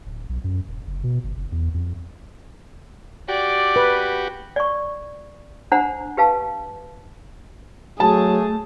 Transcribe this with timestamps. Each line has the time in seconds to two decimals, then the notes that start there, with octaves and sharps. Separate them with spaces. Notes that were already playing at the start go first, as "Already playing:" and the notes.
0.06 D1
0.29 B1
0.44 F#2
0.68 D#1
0.87 F#1
1.04 B2
1.24 G1
1.36 F#1
1.52 E2
1.74 F2
3.29 F#4 G4 D5
3.76 B4
4.56 D5 C#6
5.72 D4 C5 F#5 A#5
6.17 G4 B4 F5 A5
8.00 F#3 A3 G#4 A5